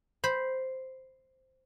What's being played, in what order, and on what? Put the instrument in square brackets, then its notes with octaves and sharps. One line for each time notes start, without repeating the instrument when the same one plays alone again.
[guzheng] C5 B5